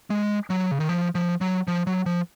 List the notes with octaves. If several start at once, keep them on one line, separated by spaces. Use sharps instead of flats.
G#3
F#3
C#3
D#3
F3
F3
F#3
F3
F#3
F3